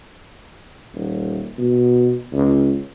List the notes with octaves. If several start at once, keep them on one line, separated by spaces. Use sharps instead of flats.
D#1
B2
C#2